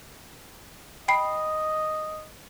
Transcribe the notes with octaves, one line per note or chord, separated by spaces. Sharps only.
D#5 G5 B5 C7